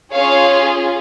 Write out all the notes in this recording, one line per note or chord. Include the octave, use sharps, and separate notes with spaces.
C#4 F4 G#4 C#5 F5